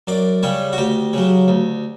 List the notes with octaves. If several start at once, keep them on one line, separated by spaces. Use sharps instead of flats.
F#2 D5
C#3 G3 C#5
F#4
D2 G4
C#3 F#3
D2